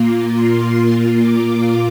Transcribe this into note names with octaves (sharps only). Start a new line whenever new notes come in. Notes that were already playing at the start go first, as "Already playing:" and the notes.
Already playing: A#2 A#3 F4
C6
D6